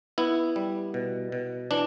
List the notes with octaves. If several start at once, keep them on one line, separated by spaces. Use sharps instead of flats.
B3 E4
G3
B2
B2
E3 D4